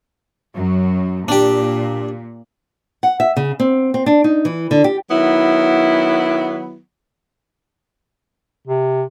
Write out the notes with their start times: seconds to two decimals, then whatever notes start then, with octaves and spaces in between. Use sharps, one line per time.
0.55 F#2 F#3
1.28 A#2 D4 G4
3.03 F#5
3.20 E5
3.37 C#3
3.60 C4
3.94 C4
4.06 D4
4.24 D#4
4.45 E3
4.71 D3
4.84 G4
5.11 D#3 F#3 B3 E4
8.67 C3